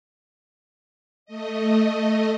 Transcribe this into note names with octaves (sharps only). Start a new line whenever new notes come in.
A3 D#5